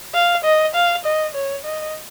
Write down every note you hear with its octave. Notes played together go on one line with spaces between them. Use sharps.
F5
D#5
F5
D#5
C#5
D#5